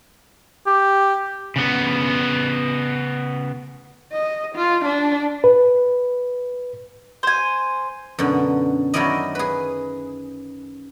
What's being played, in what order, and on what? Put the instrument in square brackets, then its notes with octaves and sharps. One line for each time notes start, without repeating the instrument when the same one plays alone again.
[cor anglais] G4
[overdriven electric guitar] C#3 B3
[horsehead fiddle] D#5
F4
D4
[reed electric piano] B4
[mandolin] C5 G#5
[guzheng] F#2 B2 D3
D#3 F#3 C#4 E4 D5 D#5
G#4 B4